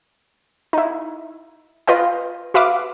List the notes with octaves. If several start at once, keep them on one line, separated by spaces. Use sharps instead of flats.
D#4 E4
F4 B4 D#5 G5
F#4 B4 E5 F5 D6